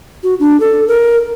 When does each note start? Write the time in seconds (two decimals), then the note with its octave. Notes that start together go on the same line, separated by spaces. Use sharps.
0.23 F#4
0.40 D4
0.60 A4
0.88 A#4